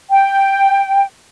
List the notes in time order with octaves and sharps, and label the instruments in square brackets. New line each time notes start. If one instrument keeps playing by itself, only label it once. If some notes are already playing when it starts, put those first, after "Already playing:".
[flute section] G5